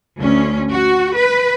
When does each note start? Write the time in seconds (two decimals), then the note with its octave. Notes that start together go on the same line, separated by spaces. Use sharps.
0.19 D2 C#4
0.70 F#4
1.15 B4